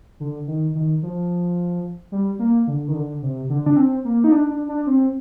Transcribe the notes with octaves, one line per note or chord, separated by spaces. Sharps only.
D3
D#3
D#3
F3
G3
A#3
D3
D#3
D3
C3
D3
D4
C4
A#3
D#4
D4
D4
D4
C4